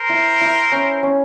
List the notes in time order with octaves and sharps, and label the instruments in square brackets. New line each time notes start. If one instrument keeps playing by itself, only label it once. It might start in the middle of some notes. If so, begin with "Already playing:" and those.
Already playing: [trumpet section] A#4 C5
[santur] E4
E4
C#4
C#4